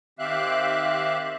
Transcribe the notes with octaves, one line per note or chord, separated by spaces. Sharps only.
D#3 C4 G4 E5 F5 F#6